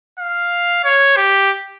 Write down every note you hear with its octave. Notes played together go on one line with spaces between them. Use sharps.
F5
C#5
G4